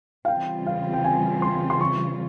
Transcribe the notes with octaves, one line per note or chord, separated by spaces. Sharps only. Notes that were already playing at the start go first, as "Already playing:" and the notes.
F5
C#3 E3 G3 C4 F4 G5
F5
G5
G#5
C6
C6
C#6